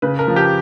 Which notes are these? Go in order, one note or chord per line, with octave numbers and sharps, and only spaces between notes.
C#3 B4
A#4
F3
G4